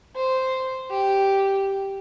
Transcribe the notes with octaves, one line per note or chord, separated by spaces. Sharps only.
C5
G4